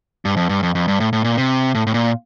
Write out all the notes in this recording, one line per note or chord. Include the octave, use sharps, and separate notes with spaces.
G2
F2
G2
F2
F2
G2
A2
A2
A#2
C3
A2
A2
A#2